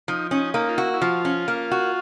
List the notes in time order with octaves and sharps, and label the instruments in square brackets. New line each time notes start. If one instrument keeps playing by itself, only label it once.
[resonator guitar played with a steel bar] F3 [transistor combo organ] D#4
[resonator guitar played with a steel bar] C#4 [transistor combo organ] D#4
[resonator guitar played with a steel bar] A#3 [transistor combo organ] D#4
[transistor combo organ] F4
[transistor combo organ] E4 [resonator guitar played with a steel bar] F#4
[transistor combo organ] E4
[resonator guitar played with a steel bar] F3 [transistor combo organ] F4
[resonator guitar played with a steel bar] C#4
A#3
F#4